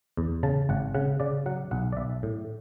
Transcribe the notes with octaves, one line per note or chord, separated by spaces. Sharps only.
E2
C#3 A5
G#1 F#5
C#3 F#5
C#3 D5
F#3 F#5
B1 F#5
D5
B1 E5
A2